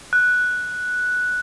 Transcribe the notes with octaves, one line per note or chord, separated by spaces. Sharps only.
F#6